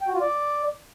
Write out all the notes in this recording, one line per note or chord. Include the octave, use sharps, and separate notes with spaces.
G5
F#4
F4
D5